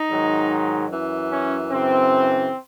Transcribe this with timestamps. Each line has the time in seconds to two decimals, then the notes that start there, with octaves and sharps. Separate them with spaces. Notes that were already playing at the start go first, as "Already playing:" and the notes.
Already playing: D#4
0.11 G#2 D#3 F#3
0.91 F#2 E3
1.30 C#4
1.71 F#2 C#3 E3 C4